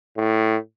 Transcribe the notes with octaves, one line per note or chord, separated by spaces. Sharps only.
A2